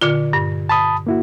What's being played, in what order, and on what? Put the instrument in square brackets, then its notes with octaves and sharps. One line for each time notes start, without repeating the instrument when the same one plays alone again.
[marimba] A#2 D3 F4
G2
[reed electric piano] A5 B5 D#6
A#3 E4 F#4